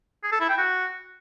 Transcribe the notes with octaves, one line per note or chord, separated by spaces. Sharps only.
G#4
A4
E4
G5
F#4